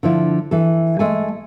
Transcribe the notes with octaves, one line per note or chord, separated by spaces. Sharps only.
D3 F3 E4
E3 A4
G#3 A3 G#5